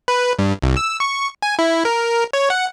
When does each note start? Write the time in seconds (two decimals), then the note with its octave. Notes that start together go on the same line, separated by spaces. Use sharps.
0.08 B4
0.39 G2
0.62 C2
0.77 E6
1.00 C#6
1.42 G#5
1.59 E4
1.85 A#4
2.33 C#5
2.50 F#5